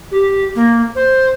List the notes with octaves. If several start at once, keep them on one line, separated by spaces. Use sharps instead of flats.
G4
A#3
C5